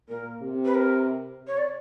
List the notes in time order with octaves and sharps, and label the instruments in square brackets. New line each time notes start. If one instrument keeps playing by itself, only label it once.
[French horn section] A#2 [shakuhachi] A#4
[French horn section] C3
[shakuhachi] B4
A#4
[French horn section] C3
[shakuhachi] C#5
D5